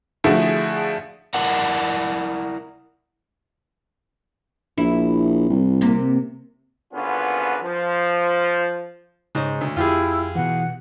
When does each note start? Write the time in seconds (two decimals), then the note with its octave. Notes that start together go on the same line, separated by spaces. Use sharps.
0.24 D3 F3 A3 E4 F#4 G#4
1.34 E4 A#4 D5 F#5
4.78 A#1 E4
5.50 C2
5.81 C3 A#3
6.93 G#1 D3 B3 C#4 F4 B4
7.63 F3
9.35 G#2 C#3 D#4 C#5
9.61 D2
9.76 F2 E4 F4 G4 G#4
10.36 B2 E3 F#5